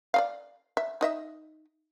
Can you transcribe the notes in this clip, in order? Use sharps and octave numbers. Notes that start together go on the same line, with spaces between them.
D5 D#5 F5
E5
D#4 D#5 E5